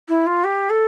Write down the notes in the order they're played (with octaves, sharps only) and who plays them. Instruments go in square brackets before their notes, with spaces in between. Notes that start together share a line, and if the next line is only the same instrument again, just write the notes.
[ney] E4
F4
G4
A4